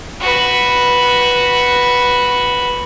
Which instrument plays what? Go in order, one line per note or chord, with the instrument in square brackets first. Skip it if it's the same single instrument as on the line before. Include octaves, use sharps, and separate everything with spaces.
[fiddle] F#4 B4